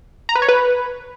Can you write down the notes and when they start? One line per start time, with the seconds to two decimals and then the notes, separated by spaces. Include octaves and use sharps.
0.29 A#5
0.35 B4
0.42 C#5
0.48 B4